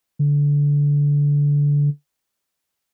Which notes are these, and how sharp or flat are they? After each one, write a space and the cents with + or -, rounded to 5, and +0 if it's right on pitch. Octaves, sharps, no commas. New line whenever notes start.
D3 -20